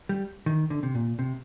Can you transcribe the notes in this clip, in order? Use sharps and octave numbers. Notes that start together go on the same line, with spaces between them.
G3
D#3
D3
C3
A#2
C3